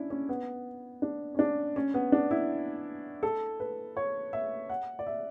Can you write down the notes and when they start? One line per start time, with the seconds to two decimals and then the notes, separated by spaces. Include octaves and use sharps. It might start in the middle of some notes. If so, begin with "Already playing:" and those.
Already playing: C#4 D4 E4
0.10 C#4
0.29 B3
1.02 D4
1.35 C#4
1.39 D4
1.76 C#4
1.94 B3
2.12 D4
2.31 E4
3.23 A4
3.60 B4
3.97 C#5
4.33 E5
4.70 F#5
4.99 D5
5.07 E5